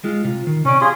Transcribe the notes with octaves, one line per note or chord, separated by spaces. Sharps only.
G3 G#3 F4
C3 F4
D#3
C3 C#4 D5
F4 G4 G#4